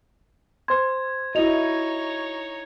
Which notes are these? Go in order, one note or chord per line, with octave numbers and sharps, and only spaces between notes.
C5 C6 G#6
D#4 E4 F#4 C#5 D#5 F7